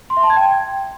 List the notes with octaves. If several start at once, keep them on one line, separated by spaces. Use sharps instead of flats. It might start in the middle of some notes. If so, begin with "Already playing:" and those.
C6
E5
A5
G#6
G5